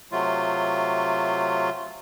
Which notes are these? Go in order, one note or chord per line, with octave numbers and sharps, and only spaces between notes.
C3 F#3 A3 F4